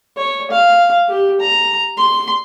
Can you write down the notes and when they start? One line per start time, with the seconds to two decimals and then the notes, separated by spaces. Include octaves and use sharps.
0.17 C#5
0.51 F5
1.09 G4
1.40 A#5
1.97 C6